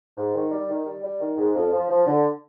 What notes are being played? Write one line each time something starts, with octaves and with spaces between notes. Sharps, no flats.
G#2
D#3
G3
D#3
G3
G3
D#3
G#2
F2
F3
F3
D3